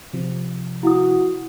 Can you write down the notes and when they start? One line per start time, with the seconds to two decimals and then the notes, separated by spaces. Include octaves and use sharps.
0.13 C3 F3
0.83 E4 F#4 D#6